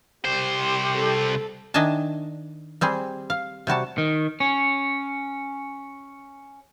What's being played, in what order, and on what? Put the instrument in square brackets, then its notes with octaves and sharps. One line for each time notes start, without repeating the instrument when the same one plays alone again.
[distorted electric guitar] C2 C5 [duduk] G4
[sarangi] A4
[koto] D#3 D4 D#5 E5 G#5 A5
G3 C4 G#4
F5
C3 G3 F#4 A5
[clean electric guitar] D#3
C#4